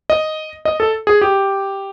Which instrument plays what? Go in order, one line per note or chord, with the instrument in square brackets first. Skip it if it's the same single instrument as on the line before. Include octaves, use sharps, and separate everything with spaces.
[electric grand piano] D#5
D#5
A4
G#4
G4